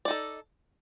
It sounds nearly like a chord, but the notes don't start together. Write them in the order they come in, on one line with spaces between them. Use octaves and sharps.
D5 D#4 A4